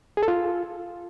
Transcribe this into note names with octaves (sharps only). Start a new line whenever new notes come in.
G#4
A4
F4